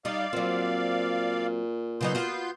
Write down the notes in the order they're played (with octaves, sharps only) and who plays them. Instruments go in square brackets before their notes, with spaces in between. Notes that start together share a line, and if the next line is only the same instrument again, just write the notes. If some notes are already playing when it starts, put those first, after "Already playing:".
[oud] G3 D#4 [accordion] D5 F5
[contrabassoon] A#2 [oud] F#3 C4
[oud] C#3 F#3 D#4 [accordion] B3 C6 G6
[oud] F4 F#4